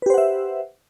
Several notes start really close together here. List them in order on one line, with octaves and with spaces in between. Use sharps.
B4 G4 C5 F#5 E5